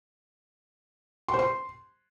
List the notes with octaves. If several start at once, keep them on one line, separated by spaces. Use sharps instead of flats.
C6
C5
C6